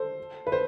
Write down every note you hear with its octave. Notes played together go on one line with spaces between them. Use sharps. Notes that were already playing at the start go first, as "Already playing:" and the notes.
Already playing: A4 C5
B4
C5